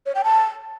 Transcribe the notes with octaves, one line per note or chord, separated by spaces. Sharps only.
C#5
G5
A5